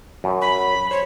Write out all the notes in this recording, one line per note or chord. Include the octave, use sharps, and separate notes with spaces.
F#2
B5
C5 C#5